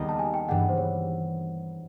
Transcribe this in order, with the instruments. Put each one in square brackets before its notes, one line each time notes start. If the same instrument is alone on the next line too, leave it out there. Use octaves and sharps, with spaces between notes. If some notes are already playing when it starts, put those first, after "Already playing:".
Already playing: [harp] D#2 D#3 G3 B3 D#4
[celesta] A5
G#5
G5
[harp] G2 E3 G3 [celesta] F#5
[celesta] C5
C#5